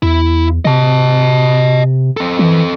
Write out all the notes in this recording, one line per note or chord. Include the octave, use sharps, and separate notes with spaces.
E2 E4
C3 D#5 A5
C4 A4
E3